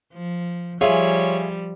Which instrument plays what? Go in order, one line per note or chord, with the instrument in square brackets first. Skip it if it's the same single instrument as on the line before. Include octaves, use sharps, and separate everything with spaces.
[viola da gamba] F3
[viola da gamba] F3 G3 [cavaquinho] F4 G#5 [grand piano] G#4 E5 [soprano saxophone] C#5